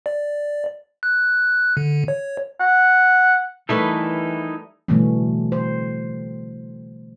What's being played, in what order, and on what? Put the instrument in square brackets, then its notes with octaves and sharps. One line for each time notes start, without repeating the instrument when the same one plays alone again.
[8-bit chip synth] D5
F#6
D3
C#5
[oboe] F#5
[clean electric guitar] D#3 [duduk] E3 [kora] G3 A3 B4 [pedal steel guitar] D#4 E4 A4
[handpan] B2 D3 E3 G3 A3 C#4
C5